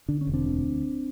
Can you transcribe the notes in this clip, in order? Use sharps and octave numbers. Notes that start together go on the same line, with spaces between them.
D3 D4
C#4
E1
C4 D4
D2